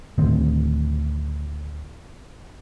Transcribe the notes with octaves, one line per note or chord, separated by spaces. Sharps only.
D2 A2 D#3 C4